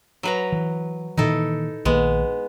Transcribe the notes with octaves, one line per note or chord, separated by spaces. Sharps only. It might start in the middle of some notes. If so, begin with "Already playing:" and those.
F#3 B4 A#5
E3
A#2 D#3 E3 D#4 E4 A4
A#1 D#3 G#3 A#3 B3